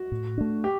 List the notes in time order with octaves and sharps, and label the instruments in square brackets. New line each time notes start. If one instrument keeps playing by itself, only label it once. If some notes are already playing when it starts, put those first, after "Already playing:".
Already playing: [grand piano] F#4
[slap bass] A2
A3 D4
[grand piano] G4